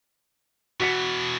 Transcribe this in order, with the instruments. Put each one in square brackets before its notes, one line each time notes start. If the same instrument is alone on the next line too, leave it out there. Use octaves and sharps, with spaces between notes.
[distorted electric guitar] B2 E3 [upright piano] F#4 B6 C#7